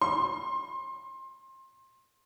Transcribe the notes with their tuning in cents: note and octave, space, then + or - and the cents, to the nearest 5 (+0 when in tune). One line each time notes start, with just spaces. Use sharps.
C6 +25